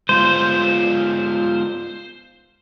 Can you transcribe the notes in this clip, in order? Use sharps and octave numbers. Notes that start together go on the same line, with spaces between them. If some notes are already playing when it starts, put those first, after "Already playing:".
G#3 B3 F4 C5